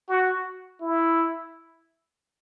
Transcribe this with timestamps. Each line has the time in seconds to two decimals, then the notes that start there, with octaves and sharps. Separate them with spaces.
0.09 F#4
0.81 E4